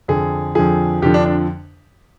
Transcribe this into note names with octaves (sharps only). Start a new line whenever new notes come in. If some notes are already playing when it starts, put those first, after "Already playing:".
F2 D3 F3 G#4
F2 D3 F3 G#4
F2 D3 F3 G4
D4
D4